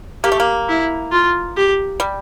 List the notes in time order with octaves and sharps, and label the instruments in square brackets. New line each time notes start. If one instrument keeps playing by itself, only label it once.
[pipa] A#3 [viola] G4
[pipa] A3
A#3
[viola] E4
F4
G4
[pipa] G3